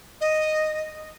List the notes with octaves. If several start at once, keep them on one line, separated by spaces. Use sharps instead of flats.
D#5